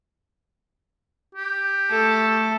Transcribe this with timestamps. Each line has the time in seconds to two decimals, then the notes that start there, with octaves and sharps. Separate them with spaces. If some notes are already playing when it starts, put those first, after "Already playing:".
1.35 G4
1.91 A3 A4